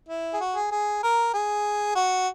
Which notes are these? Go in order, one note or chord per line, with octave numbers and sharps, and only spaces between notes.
E4
G#4
F#4
G#4
G#4
A#4
G#4
F#4